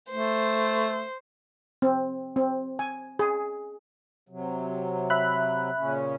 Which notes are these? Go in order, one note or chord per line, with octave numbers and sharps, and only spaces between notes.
A3 C5
C4
C4
G#5
G#4
C3 F#3
E5 B5 F#6
A#2 C#3 C#4